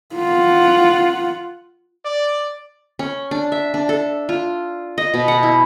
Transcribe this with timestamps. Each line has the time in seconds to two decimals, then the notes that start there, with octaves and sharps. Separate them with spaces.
0.15 F4 F#5
2.05 D5
2.99 C#4
3.31 D4
3.52 E5
3.74 D4
3.89 A4
4.29 F4
4.98 D#5
5.14 B2
5.28 F#5
5.43 E4